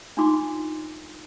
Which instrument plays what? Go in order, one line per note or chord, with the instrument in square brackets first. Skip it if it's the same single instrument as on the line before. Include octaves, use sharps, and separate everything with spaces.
[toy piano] D4 D#4 F4 C6 D6